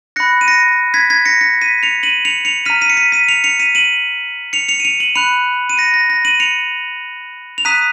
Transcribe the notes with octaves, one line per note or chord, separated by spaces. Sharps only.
B5 F#6 A#6 C#7
D#7
A#6 C#7
G#6 B6
G#6 B6
A#6 C#7
A#6 C#7
B6 D#7
C#7 F7
D#7 F#7
C#7 F7
C#7 F7
A#5 F6 B6 D#7
B6 D#7
C#7
B6 D#7
B6 D#7
C#7 F7
C#7 F7
B6 D#7
D#7 F#7
C#7 F7
C#7 F7
D#7
C#7 F7
D#7 F#7
B5 F#6 C#7 F7
D#7
A#6 C#7
A#6
A#6
D#7 F#7
C#7 F7
F7
A#5 D#6 F#6 B6 D#7